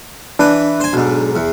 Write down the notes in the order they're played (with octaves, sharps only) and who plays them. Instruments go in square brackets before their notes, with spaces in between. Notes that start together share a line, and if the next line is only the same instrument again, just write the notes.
[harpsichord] E3 B4 [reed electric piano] D4
[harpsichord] C5 G#5
B1 G#2
E2